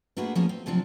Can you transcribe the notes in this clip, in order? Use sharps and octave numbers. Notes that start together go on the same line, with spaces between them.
A3 A#3 D4 F#4 G#4 B4
F3 A#3 B3 C#4 G#4
C4
D2 C3 F3 F#3 C4 D4